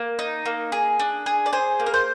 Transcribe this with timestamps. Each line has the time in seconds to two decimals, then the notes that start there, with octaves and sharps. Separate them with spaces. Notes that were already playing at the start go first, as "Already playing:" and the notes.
Already playing: A#3
0.19 D#4
0.46 A#3
0.72 G#4
1.00 D4
1.26 G#4
1.46 D5
1.53 G#4 C5
1.80 A#3
1.86 A#4
1.94 C5